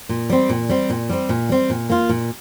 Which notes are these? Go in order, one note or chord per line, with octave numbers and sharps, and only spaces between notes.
A#2
G3 C4
A#2
G3 C4
A#2
G3 C4
A#2
G3 C4
A#2
A#3 F4
A#2